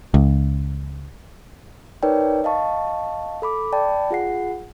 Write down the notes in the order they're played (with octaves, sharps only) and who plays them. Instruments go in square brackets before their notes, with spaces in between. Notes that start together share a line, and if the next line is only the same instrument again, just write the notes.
[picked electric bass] C#2
[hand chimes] D#4 A#4 B4 C#5 D5 G5
D#5 F5 A5 C#6
A4 B5 D6
D5 G5 A5 B5
F4 G#4 F#5 C7